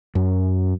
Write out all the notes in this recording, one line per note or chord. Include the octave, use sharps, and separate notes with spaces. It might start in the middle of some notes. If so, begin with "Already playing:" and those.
F#2